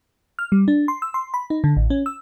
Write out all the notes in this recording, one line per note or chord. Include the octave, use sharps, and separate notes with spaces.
F6
G3
D4
C6
E6
C6
B5
D#4
D3
A1
C#4
E6